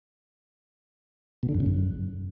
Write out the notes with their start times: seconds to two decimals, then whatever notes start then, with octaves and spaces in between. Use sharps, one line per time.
1.43 B2
1.49 D3
1.54 F#2
1.60 C#3
1.66 F#2